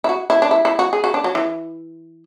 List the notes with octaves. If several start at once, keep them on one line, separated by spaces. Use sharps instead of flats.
E4
F#4
E4
D4
E4
E4
F#4
G#4
F#4
D4
F#3
E3